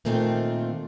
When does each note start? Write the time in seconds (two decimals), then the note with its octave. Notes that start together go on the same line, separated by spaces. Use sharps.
0.05 A#2 D#3 A3 C4 D4 F4